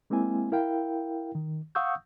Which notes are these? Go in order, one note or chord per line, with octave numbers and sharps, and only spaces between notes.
G#3 A#3 C4 E4 G#5
E4 A#4 F5 G5
D#3
F5 F#5 C#6 D#6 E6 G6